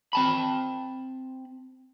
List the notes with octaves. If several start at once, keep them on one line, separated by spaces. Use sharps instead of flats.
C4 A5 B5